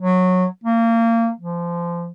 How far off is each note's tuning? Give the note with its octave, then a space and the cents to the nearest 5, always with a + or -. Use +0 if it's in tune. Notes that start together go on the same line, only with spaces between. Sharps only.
F#3 -15
A#3 -25
F3 -25